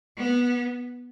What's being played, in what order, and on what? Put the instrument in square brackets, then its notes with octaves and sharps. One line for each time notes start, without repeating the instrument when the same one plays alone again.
[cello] B3